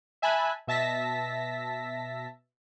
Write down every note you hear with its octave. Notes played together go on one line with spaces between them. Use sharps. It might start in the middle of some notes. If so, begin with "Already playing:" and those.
E5 G#5 A5 B5 F#6
B2 E5 A5 A#6 B6